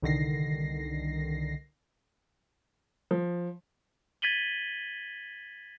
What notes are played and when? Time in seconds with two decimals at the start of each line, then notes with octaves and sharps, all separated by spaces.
0.02 C2 D3 D#3 A#6 C7
3.11 F3
4.22 G#6 A6 B6 D#7 F#7 G7